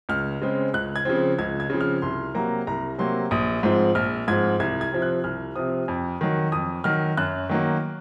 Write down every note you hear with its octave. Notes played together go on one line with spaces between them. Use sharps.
C#2 F6
C#3 G#3 C4
C#2 F#6
G#6
C#3 F3 C4
C#2 G#6
G#6
C#3 F3 C4
F6
C2 C6
C3 F#3 A#3 A#5
C2 A#5
C3 F#3 A#3 C6
A#1 D#6
G#2 F3 C4
A#1 F6
G#2 F3 C4 G#6
C2 G#6
G#6
C3 F3 C4
F#6
C2 F6
C3 F3 C4 D#6
F2
D#3 F#3
F2 D#6
D#3 F#3 F6
F#2 F#6
D#3 F#3 A#3